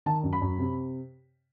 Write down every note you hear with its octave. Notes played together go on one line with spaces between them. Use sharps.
D#3 A5
F#2
B5
F#2
C3